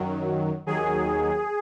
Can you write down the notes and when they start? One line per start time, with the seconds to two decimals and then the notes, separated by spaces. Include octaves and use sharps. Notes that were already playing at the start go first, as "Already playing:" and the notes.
Already playing: F#2 D#3 F#3
0.66 D#2 D#3 F#3 G#4